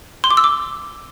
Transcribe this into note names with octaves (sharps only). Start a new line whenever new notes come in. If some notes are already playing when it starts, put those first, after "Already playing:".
C6
D6
E6
D6